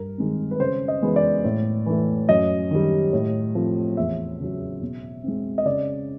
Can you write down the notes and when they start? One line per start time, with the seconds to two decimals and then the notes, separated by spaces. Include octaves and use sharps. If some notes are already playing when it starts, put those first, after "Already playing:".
Already playing: G2 A#4
0.18 D#3 G#3 C4
0.51 B4
0.60 C#3 C5
0.88 D#5
1.02 E3 G#3 B3
1.16 D5
1.44 A2
1.86 E3 A3
2.29 F#2 D#5
2.71 D#3 G3
3.13 A2
3.55 F3 A3 C4
3.97 E2 E5
4.40 C#3 F#3
4.81 B2
5.24 G#3 C4
5.58 D#5
5.65 C#3 D5